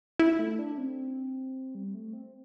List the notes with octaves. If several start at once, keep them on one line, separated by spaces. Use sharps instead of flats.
E4
A3
D4
C4
G3
A3
C4